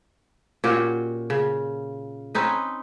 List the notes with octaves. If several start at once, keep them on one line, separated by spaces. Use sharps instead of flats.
A#2 C#4 F#4 G4
C#3
C4 C#4 D#4 B4